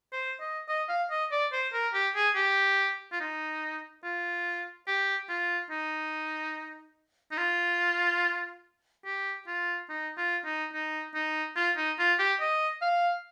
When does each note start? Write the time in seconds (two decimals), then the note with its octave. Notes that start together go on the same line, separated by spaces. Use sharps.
0.13 C5
0.41 D#5
0.68 D#5
0.89 F5
1.10 D#5
1.31 D5
1.53 C5
1.73 A#4
1.94 G4
2.15 G#4
2.35 G4
3.12 F4
3.20 D#4
4.04 F4
4.87 G4
5.29 F4
5.70 D#4
7.31 D#4
7.38 F4
9.05 G4
9.47 F4
9.89 D#4
10.17 F4
10.45 D#4
10.73 D#4
11.14 D#4
11.56 F4
11.77 D#4
11.99 F4
12.19 G4
12.40 D#5
12.82 F5